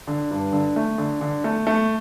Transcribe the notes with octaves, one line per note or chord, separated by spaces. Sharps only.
D3
G2
D3
A3
D3
D3
A3
A3